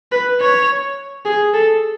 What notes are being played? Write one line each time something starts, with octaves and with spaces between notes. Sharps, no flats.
B4
C#5
G#4
A4